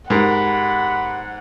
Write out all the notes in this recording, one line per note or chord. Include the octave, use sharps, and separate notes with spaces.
G#2 G4 A#4 F#5 B5